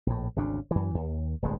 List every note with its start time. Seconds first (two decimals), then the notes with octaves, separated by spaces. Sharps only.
0.07 A#1 A2
0.36 G#1 D2 C#3 D4
0.71 F#2 E3
0.94 D#2
1.42 D1 G1 G2 G#3